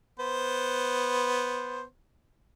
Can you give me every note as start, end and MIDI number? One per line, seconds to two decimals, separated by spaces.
0.20 1.83 59
0.20 1.83 72